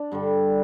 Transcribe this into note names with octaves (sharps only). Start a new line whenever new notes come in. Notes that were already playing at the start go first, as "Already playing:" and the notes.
Already playing: D4
G2 D3 G3